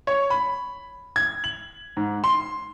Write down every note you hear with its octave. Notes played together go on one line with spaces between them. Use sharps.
C#5
B5
G#6
F#7
G#2
C6